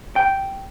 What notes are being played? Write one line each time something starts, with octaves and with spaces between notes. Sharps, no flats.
G5